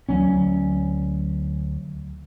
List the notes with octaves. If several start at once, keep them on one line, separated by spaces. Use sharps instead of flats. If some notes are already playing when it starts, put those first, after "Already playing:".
D2 F#3 C#4